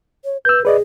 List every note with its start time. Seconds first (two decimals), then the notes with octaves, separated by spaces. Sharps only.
0.25 C#5
0.45 B4 E6 G6
0.65 G#4 B4 D5 D#5